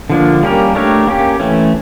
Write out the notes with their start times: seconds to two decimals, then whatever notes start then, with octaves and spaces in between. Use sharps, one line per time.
0.10 D3 F3 A#3 D4
0.43 G3 A#3 C#4 G4 A#4
0.75 A3 D4 G4 A#4 C#5
1.07 A#3 C#4 G4
1.40 E3 A3 C#4